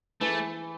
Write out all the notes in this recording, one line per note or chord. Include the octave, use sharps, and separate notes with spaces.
E3 A3